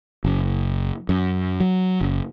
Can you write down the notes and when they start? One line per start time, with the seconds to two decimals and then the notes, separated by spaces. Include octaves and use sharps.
0.24 F#1
1.09 F#2
1.60 F#3
2.01 F#1